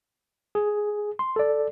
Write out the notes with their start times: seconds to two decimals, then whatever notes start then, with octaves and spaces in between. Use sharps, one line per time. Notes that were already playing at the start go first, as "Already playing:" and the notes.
0.55 G#4
1.19 C6
1.36 A4 D5